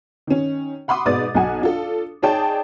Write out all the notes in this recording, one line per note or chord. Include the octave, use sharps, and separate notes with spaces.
D#3 C#4
F#5 B5 C6 D6 D#6
G#2 B2 B4 D5 D#6 A6
B1 F#3 F#5 G#5
D4 F4 A4
D#4 G#4 C#5 D5 G5 A5